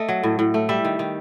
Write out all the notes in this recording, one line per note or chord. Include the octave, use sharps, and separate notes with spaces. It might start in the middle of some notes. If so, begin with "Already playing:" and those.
Already playing: A3 D#5
F#3
A2
A2
A3
G3 E5
D#3
D#3